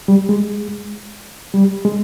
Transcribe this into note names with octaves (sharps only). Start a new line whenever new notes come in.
G3
G#3
G3
G#3